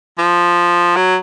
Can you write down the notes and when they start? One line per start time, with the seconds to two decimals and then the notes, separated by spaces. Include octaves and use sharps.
0.18 F3
0.96 F#3